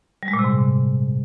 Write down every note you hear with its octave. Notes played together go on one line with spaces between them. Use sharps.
G3
G#3
A#2
C3
G#2